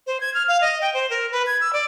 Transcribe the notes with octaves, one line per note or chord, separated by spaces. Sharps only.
C5
G#6
F6
F5
D#5
G5
C5
A#4
B4
G#6
E6
D5